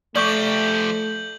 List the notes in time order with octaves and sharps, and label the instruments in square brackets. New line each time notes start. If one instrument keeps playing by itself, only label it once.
[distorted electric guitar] F3 G4 [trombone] A3 [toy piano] D5 C#6 D6 [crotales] G6 F#7